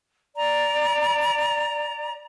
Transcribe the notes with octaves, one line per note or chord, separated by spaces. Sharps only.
D5 A#5